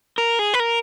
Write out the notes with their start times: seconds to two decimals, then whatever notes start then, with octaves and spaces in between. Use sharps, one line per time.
0.18 A#4
0.39 G#4
0.54 B4
0.60 A#4